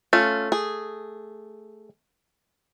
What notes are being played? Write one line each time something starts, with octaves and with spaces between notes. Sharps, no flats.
A3 C#4 F4
G#4